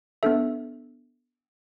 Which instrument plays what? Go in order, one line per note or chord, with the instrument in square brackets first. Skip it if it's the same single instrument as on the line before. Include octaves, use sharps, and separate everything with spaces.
[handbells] B3 D4 A4 E5